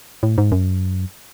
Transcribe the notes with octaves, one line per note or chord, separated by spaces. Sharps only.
A2
G#2
F#2